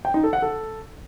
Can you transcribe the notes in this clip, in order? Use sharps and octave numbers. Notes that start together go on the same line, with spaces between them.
G5
D#4
A4
F#5
A4